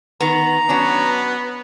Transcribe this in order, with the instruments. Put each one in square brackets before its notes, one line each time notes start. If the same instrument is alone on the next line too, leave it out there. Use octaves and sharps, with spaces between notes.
[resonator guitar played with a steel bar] D#3 B3 [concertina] A#5
[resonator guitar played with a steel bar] F#3 C#4 D4 [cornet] B3